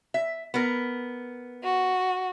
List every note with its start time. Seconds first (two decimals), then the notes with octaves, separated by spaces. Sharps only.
0.14 E5
0.54 B3 A#4
1.63 F#4